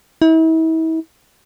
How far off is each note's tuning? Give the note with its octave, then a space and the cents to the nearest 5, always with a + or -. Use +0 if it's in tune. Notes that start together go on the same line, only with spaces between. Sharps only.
E4 -40